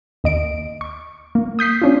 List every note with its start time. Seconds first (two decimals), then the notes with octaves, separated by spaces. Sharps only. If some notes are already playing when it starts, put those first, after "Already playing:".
0.24 D#2 D#5 D7
0.81 C#6
1.35 A#3
1.59 D#6 G6 B6 C7
1.82 C#4 D4 F4